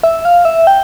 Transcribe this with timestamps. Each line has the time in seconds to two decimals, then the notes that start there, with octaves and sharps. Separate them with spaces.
0.03 E5
0.25 F5
0.45 E5
0.67 G5